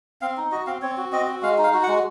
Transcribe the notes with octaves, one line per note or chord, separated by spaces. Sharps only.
C4 F5
D#4
F#4 D#5
C4 F5
C4 C#5
F#4
C4 D#5
F#4
G#3 F5
D#4
F5
F#4
F#5
G#3